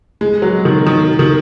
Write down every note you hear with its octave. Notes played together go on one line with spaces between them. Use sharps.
G#3
F#3
D#3
D#3
D#3